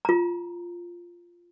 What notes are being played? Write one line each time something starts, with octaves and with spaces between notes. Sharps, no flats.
F4 A#5